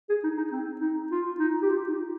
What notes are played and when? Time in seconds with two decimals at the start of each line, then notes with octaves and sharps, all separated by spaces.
0.09 G#4
0.24 D#4
0.37 D#4
0.52 C4
0.81 D#4
1.11 F4
1.39 D#4
1.62 G4
1.69 F4
1.88 D#4